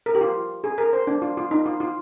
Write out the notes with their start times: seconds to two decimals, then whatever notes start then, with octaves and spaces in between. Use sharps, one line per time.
0.06 A#4
0.15 G4
0.21 F4
0.64 G#4
0.78 A#4
0.93 C5
1.07 D4
1.22 F4
1.37 F4
1.51 D#4
1.66 F4
1.80 F4